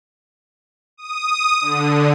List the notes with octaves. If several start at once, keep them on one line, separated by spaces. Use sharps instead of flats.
D#6
D3